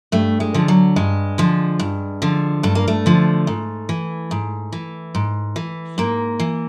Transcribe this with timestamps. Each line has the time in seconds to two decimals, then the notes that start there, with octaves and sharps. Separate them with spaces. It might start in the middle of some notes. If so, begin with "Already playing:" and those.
0.12 G2 A3
0.40 G#3
0.54 D3 F3
0.68 F#3
0.96 G2 G#3
1.38 D3 F3
1.80 G2
2.22 D3 F3
2.63 G2 A3
2.75 A#3
2.88 A3
3.06 D3 F3
3.47 G#2
3.89 E3
4.31 G#2
4.73 E3
5.15 G#2
5.56 E3
5.98 G#2 A#3
6.40 E3